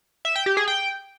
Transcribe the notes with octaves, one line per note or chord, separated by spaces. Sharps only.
E5
G5
G4
G#4
G5